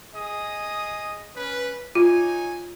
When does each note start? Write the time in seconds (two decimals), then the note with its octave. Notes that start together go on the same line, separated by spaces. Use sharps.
0.14 G#4 D#5 D#6
1.34 C#4 B4
1.95 D#4 F4 C#5 G#5